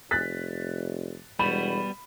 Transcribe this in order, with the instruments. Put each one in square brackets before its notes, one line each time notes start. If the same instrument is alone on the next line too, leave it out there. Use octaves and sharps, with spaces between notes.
[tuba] F1 [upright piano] F#6 A6 B6
[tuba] E1 [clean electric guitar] G3 B3 F#4 [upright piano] B5